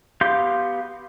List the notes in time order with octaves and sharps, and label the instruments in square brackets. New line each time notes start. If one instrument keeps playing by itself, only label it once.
[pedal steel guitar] B3 G4 F5 C6 G6